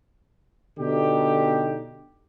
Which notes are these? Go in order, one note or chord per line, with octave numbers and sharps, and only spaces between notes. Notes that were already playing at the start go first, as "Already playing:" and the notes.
B2 D3 D#4 G4